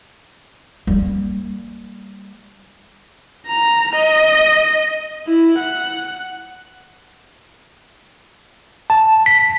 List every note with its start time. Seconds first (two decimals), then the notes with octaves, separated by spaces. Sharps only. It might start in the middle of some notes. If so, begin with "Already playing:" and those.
0.87 G3 A#3
3.47 A#5
3.95 D#5
5.27 E4
5.58 F#5
8.90 A5
9.26 B6